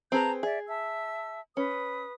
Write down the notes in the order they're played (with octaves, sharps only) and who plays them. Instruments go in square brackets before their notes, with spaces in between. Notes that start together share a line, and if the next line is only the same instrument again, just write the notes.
[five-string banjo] C4 G#4 B4 [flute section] A5 A#5 G6
[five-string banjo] G#4 [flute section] D5 E5
[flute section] E5 A5 E6
[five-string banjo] C#4 [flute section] B4 D#6